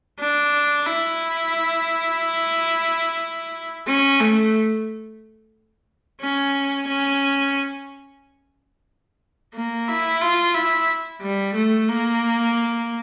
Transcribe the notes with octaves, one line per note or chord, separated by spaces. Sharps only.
D4
E4
C#4
A3
C#4
C#4
A#3
E4
F4
E4
G3
A3
A#3